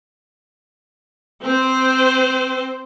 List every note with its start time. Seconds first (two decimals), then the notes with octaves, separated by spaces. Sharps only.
1.42 C4 C5